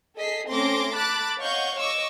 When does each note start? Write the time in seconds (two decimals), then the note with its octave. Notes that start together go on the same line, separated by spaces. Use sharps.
0.17 G#4 A4 D#5 B6 C7
0.48 A3 C4 C#4 C6 D6 A#6
0.94 A5 B5 D6 F#6 A6
1.39 C#5 D#5 F5 F#5 C#6 G6
1.78 C#5 D#5 C#6 D6 E6